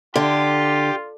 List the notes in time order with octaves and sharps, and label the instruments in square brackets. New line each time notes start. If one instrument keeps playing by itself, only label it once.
[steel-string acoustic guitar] D3 [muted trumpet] F4 [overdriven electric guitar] G4